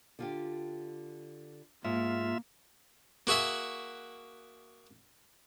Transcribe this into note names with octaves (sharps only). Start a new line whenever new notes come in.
D3 F4 G4
G#2 A#3 F4 E5
A#3 F#4 G#4 E5 F#5